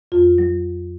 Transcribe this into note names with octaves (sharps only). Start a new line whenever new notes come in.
F2 F4
F#3